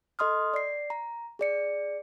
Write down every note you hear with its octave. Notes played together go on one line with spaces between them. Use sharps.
A4 D#5 C6 D#6 F6
D5 C7
A#5
G#4 D5 C#7